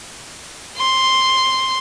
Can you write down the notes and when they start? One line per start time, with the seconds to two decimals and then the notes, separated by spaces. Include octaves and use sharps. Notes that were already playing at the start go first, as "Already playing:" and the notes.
0.78 C6